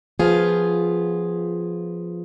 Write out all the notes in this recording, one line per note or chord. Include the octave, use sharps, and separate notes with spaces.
F3 B3 F4 G#4